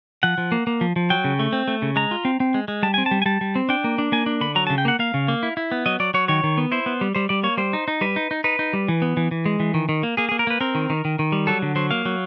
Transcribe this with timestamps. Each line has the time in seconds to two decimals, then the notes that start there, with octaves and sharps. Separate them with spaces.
0.23 F3 F#5
0.38 F3
0.52 A#3
0.67 A#3
0.81 F3
0.96 F3
1.10 F#3 G5
1.24 C#3
1.39 A3
1.53 C4
1.68 A3
1.82 C#3
1.96 G#3 A#5
2.11 F4
2.25 C4
2.40 C4
2.54 G#3
2.68 G#3
2.83 G3 A5
2.94 C4 G#5
3.06 A5
3.11 G3
3.22 G#5
3.26 G3 A5
3.41 G3
3.55 C4
3.69 D4 G5
3.84 A#3
3.98 D4
4.12 A#3 G#5
4.26 D4
4.41 D3 B5
4.55 F#3 A#5
4.67 A5
4.70 C#3
4.78 G5
4.85 A#3 F#5
4.99 A#3 F5
5.14 C#3
5.28 A#3
5.43 E4
5.57 E4
5.71 B3
5.86 F#3 D#5
6.00 F#3 D5
6.14 F#3 C#5
6.28 D#3 C#5
6.44 D#3
6.57 B3
6.72 E4 C5
6.86 B3
7.01 G3
7.15 G3 C5
7.29 G3 D5
7.43 A#3 C#5
7.58 G3 C5
7.73 D#4
7.88 D#4
8.01 G3 B4
8.16 D#4
8.31 D#4
8.44 D#4 B4
8.59 D#4
8.73 G3
8.88 E3
9.02 B3
9.17 E3
9.31 E3
9.46 G#3
9.60 E3
9.74 D#3
9.89 D#3
10.03 A#3
10.17 A#3 G#4
10.29 G#4
10.31 A#3
10.39 A#4
10.47 A#3 B4
10.61 C4 A#4
10.75 D#3
10.90 D#3
11.05 D#3
11.19 D#3
11.32 G3
11.47 F#3 A4
11.62 D3
11.76 F#3 C5
11.91 A#3 F5
12.05 F#3